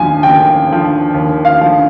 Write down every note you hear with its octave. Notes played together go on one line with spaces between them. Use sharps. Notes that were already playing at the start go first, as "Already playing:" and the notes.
Already playing: D#2 D3 F3 G#5
D#2 G5
D3 F3
D#2
F5
D3 F3